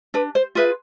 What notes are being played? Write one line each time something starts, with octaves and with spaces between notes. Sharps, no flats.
D4 B4
C5
F4 G#4 B4 E5